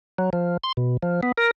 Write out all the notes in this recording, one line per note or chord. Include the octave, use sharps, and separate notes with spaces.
F#3
F3
C6
B2
F3
B3
A#4